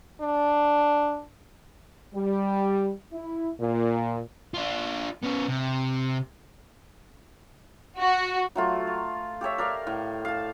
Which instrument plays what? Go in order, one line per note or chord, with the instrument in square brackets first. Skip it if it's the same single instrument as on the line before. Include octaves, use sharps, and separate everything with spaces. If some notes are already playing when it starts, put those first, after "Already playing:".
[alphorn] D4
[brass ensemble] G3
E4
A#2
[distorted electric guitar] D4 F4
B3 C#4
C3
[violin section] F#4
[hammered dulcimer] F#3 A3 F4
F5
G4 A4 C#5 E5
A#4 D5 F5
A2
F5 A5